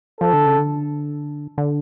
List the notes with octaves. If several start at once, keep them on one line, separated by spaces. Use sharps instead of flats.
F3 A4
D3
C#3
D3
D3